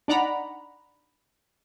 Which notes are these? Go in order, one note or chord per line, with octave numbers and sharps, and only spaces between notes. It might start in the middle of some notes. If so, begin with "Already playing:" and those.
D4 D#4 D5 F#5 A#5 B5